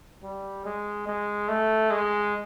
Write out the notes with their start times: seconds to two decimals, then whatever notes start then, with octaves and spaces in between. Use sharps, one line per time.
0.23 G3
0.65 G#3
1.07 G#3
1.48 A3
1.90 G#3